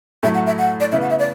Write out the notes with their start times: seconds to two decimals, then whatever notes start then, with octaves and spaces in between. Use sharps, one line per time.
0.23 A2 F#3 A3 E5
0.34 F#5
0.46 E5
0.58 F#5
0.80 D5
0.92 C#3 E3 B3 E5
1.01 F#5
1.10 E5
1.19 D5